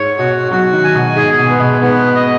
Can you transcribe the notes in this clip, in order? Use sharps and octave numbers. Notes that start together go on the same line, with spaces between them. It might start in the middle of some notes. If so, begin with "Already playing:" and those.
Already playing: G#2 C#5
B2 F#4
F#3 F#4
D#3
G#5
B2
G#2 G#4
B2
B3
B2
G#2 B3
D#5